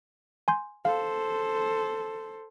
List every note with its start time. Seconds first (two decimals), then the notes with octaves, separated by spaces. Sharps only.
0.48 G#5 C6 G6
0.85 A4 C5 F5